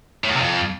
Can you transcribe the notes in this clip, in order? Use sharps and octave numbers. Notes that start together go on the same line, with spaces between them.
A2
E2
C3
F2